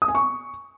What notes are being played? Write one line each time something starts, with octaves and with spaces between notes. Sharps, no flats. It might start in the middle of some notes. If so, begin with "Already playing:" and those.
D#6
G#5
C#6